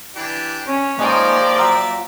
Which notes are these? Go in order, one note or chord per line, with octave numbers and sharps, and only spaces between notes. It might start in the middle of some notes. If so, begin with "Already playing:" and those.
E3 D4 G4
C#4 C#5
F3 G#3 A#3 D#4 D5 G5 G#5
F#3 F4 E5